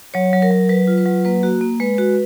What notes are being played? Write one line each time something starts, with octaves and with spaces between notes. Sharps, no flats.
F#3 C#5
F#3
A#4
F#3
F#3 B4
F4
B4
F#3
A#3 B4
A#3 F#4
A#3
G#3 B4
F#4